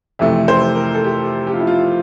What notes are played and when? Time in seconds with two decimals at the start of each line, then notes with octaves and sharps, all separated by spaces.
0.19 F2 C3 E3 A3 E5
0.48 C5
0.75 A#4
0.95 A4
1.04 G4
1.47 G4
1.53 F4
1.60 E4
1.67 F4